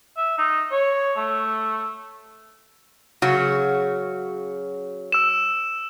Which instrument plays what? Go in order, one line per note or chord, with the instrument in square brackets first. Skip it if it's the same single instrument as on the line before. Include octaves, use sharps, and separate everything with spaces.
[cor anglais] E5
D#4
C#5
A3
[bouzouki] C#3 [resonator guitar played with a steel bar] F#3 F#4
[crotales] E6 E7